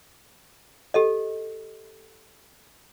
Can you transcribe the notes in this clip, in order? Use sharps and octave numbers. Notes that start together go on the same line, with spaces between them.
G4 A4 D#5